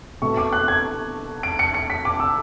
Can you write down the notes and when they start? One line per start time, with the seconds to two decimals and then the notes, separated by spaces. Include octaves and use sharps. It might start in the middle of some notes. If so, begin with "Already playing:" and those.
0.22 B2 A3 C#6
0.37 D6
0.53 F#6
0.68 G#6
1.43 D7
1.59 C#7
1.74 C#7
1.90 B6
2.05 D6
2.20 E6